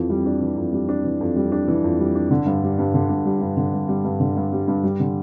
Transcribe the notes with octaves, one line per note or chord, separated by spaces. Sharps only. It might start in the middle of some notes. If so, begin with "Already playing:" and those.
Already playing: F2 E3
G3
D4
E3
F2
G3
D4
E3
F2
G3
D4
E3
F2
G3
D4
D3
G2
G3
G2
D3
G2
G3
G2
D3
G2
G3
G2
D3
G2
G3
G2
G3
D3